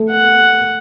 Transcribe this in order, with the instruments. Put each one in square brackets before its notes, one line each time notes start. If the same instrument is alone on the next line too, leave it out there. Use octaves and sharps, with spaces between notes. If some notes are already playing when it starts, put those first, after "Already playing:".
Already playing: [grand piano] A3
[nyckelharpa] F#5